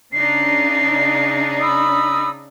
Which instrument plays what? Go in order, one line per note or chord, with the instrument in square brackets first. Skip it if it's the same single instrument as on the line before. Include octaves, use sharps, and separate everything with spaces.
[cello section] C#3 D4 D#4 [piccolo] C7
[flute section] B5 D#6 E6